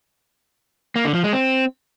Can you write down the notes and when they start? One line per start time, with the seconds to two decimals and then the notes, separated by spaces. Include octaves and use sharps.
0.96 A#3
1.05 D3
1.14 F3
1.24 G#3
1.33 C4